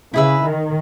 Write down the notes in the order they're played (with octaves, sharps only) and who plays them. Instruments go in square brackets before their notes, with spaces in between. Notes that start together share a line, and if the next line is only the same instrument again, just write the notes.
[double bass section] C#3 [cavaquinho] E4 G#4 B4 E5
[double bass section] D#3